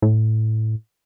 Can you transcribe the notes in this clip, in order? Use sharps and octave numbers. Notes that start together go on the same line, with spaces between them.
A2